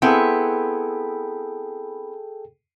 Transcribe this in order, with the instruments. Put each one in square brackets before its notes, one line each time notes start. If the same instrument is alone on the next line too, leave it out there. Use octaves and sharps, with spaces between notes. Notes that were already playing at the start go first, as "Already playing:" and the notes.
[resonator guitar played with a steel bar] B3 C4 E4 [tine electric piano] G#4 A4 G5